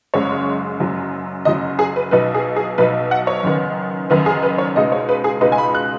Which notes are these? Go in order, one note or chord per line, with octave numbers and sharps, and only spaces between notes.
F#1 F#2 C#3 G#3 C#5
F#1 F#2 F#3
F#1 F#2 F#3 D#5
G#4
B4
B1 B2 B3 D#4 B4
G#4
G#4
B1 B2 B3 D#4 B4
F#5
C#5
F#1 F#2 D#3 B3
F#1 F#2 D#3 B3 B4
G#4
B4
C#5
C#2 B2 G#3 B3 D#4 D#5
C#5
B4
G#4
C#2 B2 G#3 B3 D#4 B4
G#5
B5
F#6